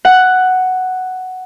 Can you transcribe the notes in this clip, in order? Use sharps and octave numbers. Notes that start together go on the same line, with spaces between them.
F#5